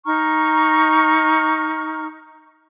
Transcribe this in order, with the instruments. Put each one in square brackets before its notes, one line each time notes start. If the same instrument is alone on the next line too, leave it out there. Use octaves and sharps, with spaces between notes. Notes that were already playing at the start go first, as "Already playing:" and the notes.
[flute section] D#4 A#5 C#6 F6